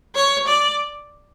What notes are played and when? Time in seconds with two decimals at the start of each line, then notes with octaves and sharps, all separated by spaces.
0.16 C#5
0.48 D5